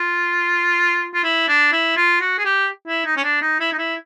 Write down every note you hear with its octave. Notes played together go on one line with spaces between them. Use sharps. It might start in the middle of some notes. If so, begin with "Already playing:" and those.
Already playing: F4
F4
E4
D4
E4
F4
F#4
G#4
G4
E4
D#4
C#4
D4
D#4
E4
D#4
E4